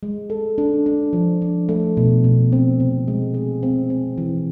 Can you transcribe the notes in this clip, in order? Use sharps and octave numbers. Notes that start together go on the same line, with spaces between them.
G#3
A4
D4
D4
F3
D4
A3
B2
B2
C4
C3
G#3
G#4
C4
C4
E3